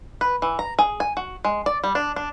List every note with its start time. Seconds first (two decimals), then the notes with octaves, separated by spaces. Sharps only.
0.21 B4
0.42 E3
0.59 A#5
0.79 G#4
1.00 G#5
1.17 F#4
1.45 G#3
1.66 D5
1.84 G3
1.95 D4
2.16 D4